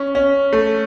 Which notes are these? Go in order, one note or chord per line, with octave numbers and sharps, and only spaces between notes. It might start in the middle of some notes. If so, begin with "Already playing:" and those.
Already playing: C#4
C#4
A3